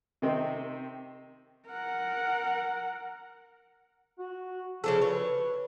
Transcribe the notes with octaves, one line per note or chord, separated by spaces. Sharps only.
C3 D#3 C4
A#4 F#5
F#4
C#3 F3 D4 A4
B4 C#5